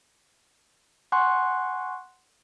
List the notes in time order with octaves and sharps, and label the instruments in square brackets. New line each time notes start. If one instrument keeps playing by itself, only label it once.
[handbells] F#5 G#5 C6 C#6 F#6